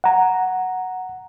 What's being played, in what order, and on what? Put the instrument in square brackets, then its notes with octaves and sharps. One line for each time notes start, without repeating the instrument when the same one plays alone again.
[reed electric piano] F#5 A#5